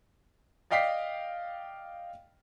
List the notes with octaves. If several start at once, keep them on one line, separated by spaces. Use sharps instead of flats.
D5 D#5 F5 G5 B6 C7